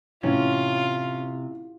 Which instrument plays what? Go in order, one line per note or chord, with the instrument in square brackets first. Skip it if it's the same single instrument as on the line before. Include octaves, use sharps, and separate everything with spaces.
[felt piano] A1 [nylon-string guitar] C3 [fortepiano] C#4 [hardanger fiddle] F4